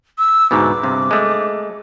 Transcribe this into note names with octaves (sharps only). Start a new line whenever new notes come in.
E6
D2 G#2 B2 D6
G2 C3
G#3 A3